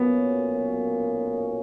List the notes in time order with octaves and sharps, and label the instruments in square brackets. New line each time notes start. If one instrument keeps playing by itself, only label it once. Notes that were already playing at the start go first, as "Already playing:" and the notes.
Already playing: [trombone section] B1 A#2 F#3 A#3 C#4 [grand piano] B3